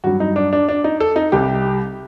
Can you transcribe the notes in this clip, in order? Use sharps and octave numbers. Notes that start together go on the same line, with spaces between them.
G2 F#3 F#4
D#4
D4
D4
D4
D#4
A4
D#4
C2 C3 G3 G4